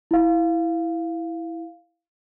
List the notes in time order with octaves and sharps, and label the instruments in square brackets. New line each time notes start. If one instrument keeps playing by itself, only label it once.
[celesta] E4 F5